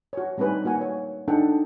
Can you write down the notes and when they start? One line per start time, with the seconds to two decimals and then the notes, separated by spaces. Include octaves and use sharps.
0.13 F#4 C#5
0.38 G3 A3 C4 D#4 B4 G#5
0.65 A#3 F#4 F#5 G#5
0.81 C#5
1.28 D4 D#4 A4 F#5 G5